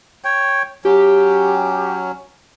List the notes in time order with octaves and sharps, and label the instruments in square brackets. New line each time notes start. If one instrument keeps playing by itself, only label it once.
[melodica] C#5 G5
[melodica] F#3 C#4 [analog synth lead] G4